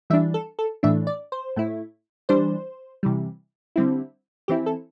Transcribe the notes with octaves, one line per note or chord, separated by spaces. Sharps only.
E3 G3 D4 E5
A4
A4
A2 E3 A3 D4 E5
D5
C5
A2 A3 E4
E3 G3 D4 C5
C3 E3 G3
D3 G3 C4 E4
E3 C4 E4 G4
A4